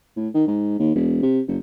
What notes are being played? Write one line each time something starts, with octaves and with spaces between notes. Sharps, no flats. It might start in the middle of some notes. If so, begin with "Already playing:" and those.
A2
D#3
G#2
D#2
E1
C3
F#1